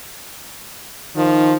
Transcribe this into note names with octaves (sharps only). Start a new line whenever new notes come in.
D#3 F3